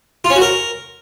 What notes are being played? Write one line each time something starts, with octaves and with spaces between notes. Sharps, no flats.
F4
C#4
F#4
A#4